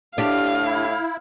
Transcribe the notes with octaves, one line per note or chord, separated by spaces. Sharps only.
A2 D4 G4 F5
E4